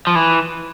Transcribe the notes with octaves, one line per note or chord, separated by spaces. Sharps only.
F3
E3